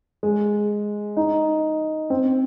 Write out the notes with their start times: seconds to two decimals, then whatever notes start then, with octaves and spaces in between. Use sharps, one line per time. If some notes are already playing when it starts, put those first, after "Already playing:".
0.23 G#3
1.17 D#4
2.10 C4